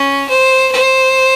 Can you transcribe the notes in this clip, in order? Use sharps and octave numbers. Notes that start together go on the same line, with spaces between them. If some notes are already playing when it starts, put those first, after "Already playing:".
Already playing: C#4
C5
C5